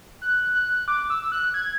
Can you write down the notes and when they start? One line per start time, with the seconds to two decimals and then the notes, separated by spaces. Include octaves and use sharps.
0.22 F#6
0.55 F#6
0.88 D6
1.10 E6
1.32 F#6
1.54 G#6